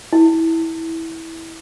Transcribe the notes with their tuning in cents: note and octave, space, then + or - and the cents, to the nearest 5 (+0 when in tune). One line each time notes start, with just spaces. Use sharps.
E4 -15